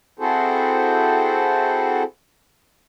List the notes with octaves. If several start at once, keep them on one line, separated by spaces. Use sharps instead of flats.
C4 E4 F#4 G#4 A4 C5